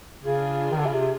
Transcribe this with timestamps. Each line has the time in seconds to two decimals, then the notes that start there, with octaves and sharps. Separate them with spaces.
0.24 C#3 D4 F4 G#4
0.72 D#3
0.79 D3
0.86 C#3
0.93 C3